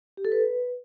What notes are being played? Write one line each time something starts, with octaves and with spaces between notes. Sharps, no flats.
G4
A4
B4